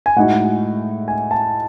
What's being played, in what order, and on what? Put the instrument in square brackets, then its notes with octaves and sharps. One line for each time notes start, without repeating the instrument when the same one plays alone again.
[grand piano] G#5
[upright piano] A2 G#3 D#4 F#4 [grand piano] F#5
[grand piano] G#5
A5